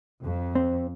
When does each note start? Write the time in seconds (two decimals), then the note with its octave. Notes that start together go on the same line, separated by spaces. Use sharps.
0.23 F2
0.55 C4